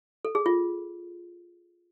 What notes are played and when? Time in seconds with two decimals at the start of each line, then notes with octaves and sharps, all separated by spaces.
0.25 A4
0.35 G#4
0.46 F4